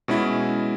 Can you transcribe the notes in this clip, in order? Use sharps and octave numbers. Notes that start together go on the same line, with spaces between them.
B2 G#3 C#4 E4